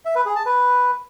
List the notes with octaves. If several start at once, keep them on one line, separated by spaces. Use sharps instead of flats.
E5
B4
G#4
A5
B4